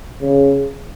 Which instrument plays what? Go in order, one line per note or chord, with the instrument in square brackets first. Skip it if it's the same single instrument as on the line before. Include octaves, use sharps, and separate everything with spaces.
[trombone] C#3